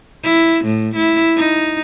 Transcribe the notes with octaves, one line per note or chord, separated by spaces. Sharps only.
E4
A2
E4
D#4